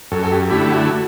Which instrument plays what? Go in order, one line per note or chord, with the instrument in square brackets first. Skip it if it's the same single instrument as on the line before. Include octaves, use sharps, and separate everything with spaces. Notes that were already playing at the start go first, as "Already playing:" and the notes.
[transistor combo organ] F#2 [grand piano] A4
[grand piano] A4
G4
[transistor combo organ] D3 A3 E4 [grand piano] G4
[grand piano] F#4